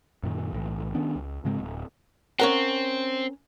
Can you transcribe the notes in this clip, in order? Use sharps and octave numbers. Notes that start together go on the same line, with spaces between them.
F#2 A#2 D#3
B1 A2 E3
D#3 B3 C#4 D4
C#2
G#2 C#3 G#3 C4
D1
C4 C#4 A#4 F#5